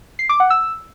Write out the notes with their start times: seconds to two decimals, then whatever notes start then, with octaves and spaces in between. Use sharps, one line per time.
0.19 C7
0.29 D6
0.40 F#5
0.50 E6